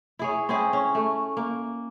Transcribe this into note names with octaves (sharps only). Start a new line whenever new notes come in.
E4 G#4 C#5
C4 C#4 E4 G#4
C#4
A3
A#3